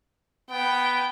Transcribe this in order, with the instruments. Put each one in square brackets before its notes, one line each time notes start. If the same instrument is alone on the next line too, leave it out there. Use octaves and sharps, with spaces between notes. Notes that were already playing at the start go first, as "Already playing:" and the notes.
[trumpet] B3 [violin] G5